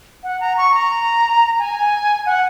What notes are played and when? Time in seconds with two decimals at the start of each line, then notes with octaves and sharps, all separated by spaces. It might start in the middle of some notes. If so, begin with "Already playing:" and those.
0.24 F#5
0.41 A#5
0.57 C#6
0.75 A#5
1.59 G#5
2.26 F#5